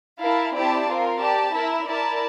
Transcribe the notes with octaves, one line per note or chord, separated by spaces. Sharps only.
E4 A#4 F5 A5
C4 E4 G4 D5 A5
C4 F4 A#4
G4 D5 A5
E4 A#4 E5
E4 A#4 D5 A5